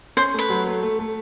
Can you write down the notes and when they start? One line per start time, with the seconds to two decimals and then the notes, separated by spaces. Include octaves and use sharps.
0.17 C#4 C5
0.34 A3 B4
0.49 F#3
0.66 A3
0.82 A3
0.99 A3